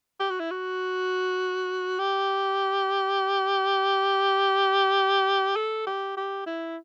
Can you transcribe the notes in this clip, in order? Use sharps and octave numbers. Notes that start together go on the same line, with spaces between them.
G4
F#4
E4
F#4
G4
A4
G4
G4
E4